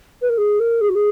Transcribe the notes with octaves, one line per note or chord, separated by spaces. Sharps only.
B4
A#4
G#4
A#4
G#4
F#4
G#4